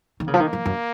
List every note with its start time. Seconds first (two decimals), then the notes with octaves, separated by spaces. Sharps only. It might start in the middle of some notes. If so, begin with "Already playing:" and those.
0.20 D#3
0.27 C#3 A#3
0.34 F3
0.40 D#3
0.53 F3
0.66 F#2